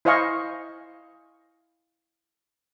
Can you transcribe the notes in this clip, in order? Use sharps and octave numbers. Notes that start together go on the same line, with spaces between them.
E4 C5 D#5 F5 G#5 C#6